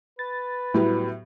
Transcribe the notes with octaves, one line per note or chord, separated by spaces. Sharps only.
B4 A6
A2 F#3 G3 B3 E4 G4